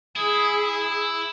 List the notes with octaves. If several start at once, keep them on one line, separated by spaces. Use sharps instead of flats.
E4 G#4